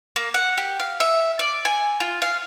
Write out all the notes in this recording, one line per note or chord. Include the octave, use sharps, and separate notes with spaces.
A#3
F#5
G4
F5
E5
D5
G#5
F4
F5